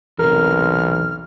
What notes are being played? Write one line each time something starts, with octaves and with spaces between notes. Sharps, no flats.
B1 E2 C3 A#4 F6